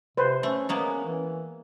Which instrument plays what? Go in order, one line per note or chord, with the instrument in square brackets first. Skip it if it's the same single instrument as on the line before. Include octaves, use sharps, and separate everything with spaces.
[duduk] C3 [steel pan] B4 C5
[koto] A3 [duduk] C#4
[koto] G#3 A#3 B3 [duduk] C#4
[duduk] E3